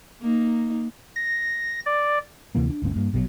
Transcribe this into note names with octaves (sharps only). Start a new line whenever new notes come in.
A#3 D#4
A#6
D5
D2 C3 E3 A#3
D4
D1 G1 A3 C#4
G2 A#3
A#1 B2 D3 F#3